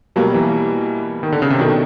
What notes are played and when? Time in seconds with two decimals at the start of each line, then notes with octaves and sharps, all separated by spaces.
0.16 B2 F#3 G3 A#3
0.34 E3
1.23 D#3
1.32 D3
1.42 C#3
1.50 C3
1.59 B2 D#3 F#3 A3 D4